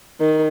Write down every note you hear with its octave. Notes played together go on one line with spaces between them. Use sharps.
D#3